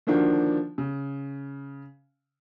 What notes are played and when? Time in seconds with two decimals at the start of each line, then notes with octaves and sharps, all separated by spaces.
0.07 D3 D#3 F3 A#3 D4 F#4
0.78 C#3